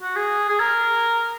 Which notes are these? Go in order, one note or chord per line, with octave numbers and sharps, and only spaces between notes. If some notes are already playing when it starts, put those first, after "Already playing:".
F#4
G#4
G#4
A#4